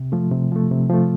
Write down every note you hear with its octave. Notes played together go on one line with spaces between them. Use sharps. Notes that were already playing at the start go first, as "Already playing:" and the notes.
Already playing: C3
F3 A3
C3
F3 A3
C3
F3 A3